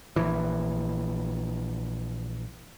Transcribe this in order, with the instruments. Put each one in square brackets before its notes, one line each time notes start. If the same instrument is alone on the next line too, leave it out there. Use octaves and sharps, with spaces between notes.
[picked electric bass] A#1 E3